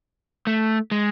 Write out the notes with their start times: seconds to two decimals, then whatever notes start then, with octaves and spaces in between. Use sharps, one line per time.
0.47 A3
0.91 G#3